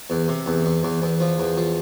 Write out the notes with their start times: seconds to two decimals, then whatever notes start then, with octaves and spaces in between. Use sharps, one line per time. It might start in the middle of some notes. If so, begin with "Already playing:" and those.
0.10 E2
0.28 C3
0.46 E2
0.65 E2
0.83 E2
1.02 E2
1.20 F3
1.38 E2
1.57 F3